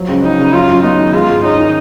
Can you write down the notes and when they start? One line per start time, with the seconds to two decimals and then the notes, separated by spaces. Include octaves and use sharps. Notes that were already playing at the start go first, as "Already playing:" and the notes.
Already playing: F3 F#3
0.09 C#2
0.23 C#4 D#4
0.39 C#3
0.53 F#3 F4
0.69 F#2
0.83 B3 D#4
0.99 D#3
1.14 G#3 F4
1.29 G#2
1.44 C#4 D#4
1.59 D#3